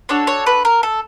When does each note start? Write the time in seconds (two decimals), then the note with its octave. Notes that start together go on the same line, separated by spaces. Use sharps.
0.09 D4 F#4 A4 C#5
0.27 C#5
0.46 B4
0.65 A#4
0.83 A4